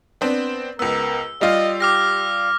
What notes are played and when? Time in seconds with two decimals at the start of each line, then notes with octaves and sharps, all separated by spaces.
0.21 B3 C4 D4
0.79 C#2 B3 A#4 E6
1.41 G3 F4 D#5
1.80 G4 D6 F6 A#6